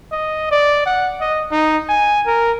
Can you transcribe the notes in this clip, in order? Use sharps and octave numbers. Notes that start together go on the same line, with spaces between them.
D#5
D5
F#5
D#5
D#4
G#5
A#4